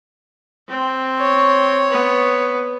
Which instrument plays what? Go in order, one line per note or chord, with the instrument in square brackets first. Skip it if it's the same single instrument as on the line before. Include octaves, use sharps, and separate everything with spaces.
[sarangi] C4
[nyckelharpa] C#5
[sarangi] B3